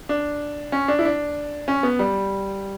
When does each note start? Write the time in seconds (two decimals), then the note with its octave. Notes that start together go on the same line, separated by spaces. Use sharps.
0.09 D4
0.72 C#4
0.88 D4
0.99 E4
1.05 D4
1.68 C#4
1.83 B3
1.99 G3